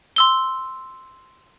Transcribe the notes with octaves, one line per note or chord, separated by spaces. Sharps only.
C6 E6 G7